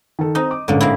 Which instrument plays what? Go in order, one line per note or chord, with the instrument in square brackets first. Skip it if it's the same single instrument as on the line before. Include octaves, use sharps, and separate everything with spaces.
[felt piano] D#3 A4
[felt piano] C4 A#5 D#6 [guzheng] D#4
[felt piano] D6
[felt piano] A1 G#2 [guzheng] D3 A#3
[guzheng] A#3 C4 E4